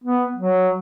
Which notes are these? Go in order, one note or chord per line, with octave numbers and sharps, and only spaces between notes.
B3
F#3